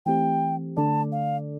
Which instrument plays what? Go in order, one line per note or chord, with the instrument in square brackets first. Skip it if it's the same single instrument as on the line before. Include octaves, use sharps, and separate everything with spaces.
[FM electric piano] E3 A3 C4 G4 [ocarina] G5
[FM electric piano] D3 A3 D4 A4 D5 [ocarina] A5
[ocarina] F5